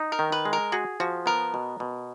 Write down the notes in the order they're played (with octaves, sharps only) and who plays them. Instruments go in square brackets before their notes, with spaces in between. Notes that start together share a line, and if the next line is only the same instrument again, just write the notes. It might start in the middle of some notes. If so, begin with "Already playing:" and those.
Already playing: [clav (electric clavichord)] D#4
[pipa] A#4
[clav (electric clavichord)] D#3
[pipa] B4
[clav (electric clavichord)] G#3
[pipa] A#4
[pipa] F#4 [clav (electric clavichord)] G#4
[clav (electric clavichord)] F3 [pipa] F#4
[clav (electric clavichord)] B3 [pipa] A#4
[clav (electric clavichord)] B2
B2